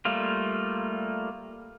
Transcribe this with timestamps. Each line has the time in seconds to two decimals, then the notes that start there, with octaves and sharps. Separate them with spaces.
0.05 G3 A3 A#3 F4